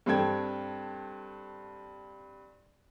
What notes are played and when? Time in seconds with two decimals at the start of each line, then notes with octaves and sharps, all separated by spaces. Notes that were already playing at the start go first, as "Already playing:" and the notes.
0.06 G2 C4 A4 G5 G#6